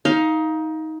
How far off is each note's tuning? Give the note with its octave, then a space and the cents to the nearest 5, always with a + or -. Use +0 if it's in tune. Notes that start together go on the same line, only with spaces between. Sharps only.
D#4 +20 F5 +0